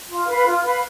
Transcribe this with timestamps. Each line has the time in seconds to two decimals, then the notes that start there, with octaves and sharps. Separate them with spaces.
0.09 F4
0.27 B4 F5 B5
0.45 F4
0.63 B4 F5 B5